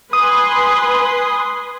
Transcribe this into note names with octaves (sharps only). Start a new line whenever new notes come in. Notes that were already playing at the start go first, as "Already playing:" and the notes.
B4 G#5 C6 D#6